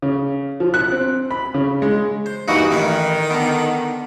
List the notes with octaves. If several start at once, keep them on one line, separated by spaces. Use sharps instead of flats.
C#3
F3
F#6
C4
B5
C#3
G#3
C5
G2 E3 A#3 D#4 F#4
A1 D#3 C#4 B4
D3 B3